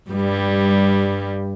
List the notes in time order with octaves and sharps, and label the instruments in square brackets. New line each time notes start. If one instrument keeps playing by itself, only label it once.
[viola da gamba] G2 G3